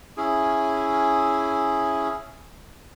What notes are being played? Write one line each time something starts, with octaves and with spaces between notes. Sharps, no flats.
C#4 E4 G#4